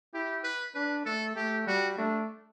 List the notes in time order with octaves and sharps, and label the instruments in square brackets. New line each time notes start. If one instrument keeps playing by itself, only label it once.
[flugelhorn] E4 [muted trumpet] G4
[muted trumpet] B4
[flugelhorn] D4 [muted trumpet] B4
[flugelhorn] A3 [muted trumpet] A4
[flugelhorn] A3 [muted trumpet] G4
[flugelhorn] G3 [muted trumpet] F#4
[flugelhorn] A3 [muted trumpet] D4